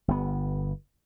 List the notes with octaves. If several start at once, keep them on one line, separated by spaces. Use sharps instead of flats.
G1 B3